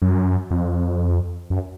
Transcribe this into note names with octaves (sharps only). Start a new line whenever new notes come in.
F#2
F2
F#2